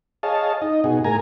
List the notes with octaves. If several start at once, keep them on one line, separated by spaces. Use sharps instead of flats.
G#4 C#5 D#5 F5 A5
D#4 D#5
B2 D#4 F#4 G#4
A2 G#4 A#4 G#5 A#5